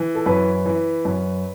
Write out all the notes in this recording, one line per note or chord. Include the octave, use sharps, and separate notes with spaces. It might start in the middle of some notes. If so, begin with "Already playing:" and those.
Already playing: E3
A4
F#2 B4
E3
F#2